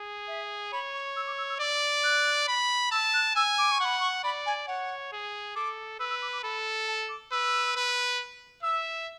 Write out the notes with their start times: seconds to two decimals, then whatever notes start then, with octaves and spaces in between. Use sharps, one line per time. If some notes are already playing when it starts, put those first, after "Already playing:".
Already playing: G#4
0.28 E5
0.72 C#5 B5
0.94 C#6
1.16 E6
1.27 D6
1.38 E6
1.49 E6
1.59 D5 D6
2.04 F#6
2.48 B5
2.91 A5 E6
3.14 F#6
3.35 G#5 E6
3.58 D6
3.72 C#6
3.80 F#5 B5
4.00 C#6
4.24 D5 B5
4.46 G#5
4.67 C#5 F#5
5.12 G#4
5.56 A4 D6
6.00 B4 E6
6.10 E6
6.22 D6
6.33 D6
6.43 A4 B5
6.87 A5
7.09 D6
7.32 B4 E6
7.76 B4
8.63 E5 E6